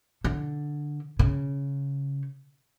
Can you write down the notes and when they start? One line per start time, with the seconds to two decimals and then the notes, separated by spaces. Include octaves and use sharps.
0.24 D3
1.19 C#3